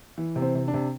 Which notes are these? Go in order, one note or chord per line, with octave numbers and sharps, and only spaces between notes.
E3
C3
C4
C3
D4
C3